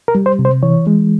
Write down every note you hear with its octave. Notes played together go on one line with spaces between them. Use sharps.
A#4
G3
C5
C3
C5
E3 C#5
G#3